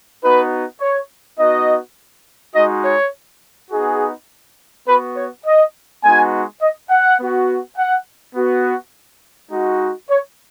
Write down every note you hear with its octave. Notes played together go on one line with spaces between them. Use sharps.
B3 D#4 F#4 B4
C#5
B3 D#4 F#4 D#5
G#3 D#4 F#4 D#5
C#5
B3 D#4 F#4 G#4
B3 F#4 B4
C#5
D#5
G#3 B3 D#4 F#4 G#5
D#5
F#5
B3 F#4
F#5
B3 F#4
G#3 D#4 F#4
C#5